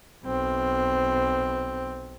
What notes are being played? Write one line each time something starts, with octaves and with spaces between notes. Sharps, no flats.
B1 C4